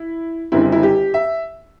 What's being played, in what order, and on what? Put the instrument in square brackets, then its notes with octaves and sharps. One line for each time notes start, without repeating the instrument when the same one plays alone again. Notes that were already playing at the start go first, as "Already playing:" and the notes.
Already playing: [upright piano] E4
F#1 F#2 D3 G3 C4 E4
E4
G4
E5